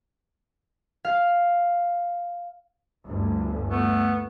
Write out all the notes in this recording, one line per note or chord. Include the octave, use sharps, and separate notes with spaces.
F5
G1 D2
A3 B3